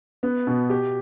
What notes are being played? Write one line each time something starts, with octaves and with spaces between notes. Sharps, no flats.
B3
B2
G4